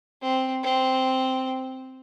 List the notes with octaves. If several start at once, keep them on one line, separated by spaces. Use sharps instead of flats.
C4
C4